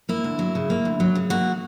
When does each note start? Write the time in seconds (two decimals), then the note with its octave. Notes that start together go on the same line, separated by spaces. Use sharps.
0.09 A#3 E4
0.24 D2
0.39 F#3
0.55 C#3
0.70 A#3
0.85 D2
1.00 F#3
1.15 C#3
1.30 A#3 F#4